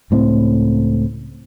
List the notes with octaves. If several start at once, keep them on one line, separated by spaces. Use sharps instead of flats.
C#2 A2 C4